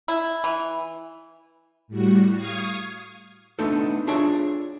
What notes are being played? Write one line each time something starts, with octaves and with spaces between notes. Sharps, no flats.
E4
E3
A2 G3 F#4
F5 C#6 D#6 G#6 C#7
A3 B3 D4 D#4 A4
D4 F4 G#4 C#5 D5 E5